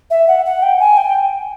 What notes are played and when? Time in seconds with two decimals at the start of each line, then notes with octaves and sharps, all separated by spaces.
0.11 E5
0.28 F#5
0.45 F#5
0.62 G5
0.80 G#5
0.97 G5